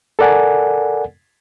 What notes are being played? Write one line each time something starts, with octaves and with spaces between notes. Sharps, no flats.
A4 A#4 D5 F#5 G#5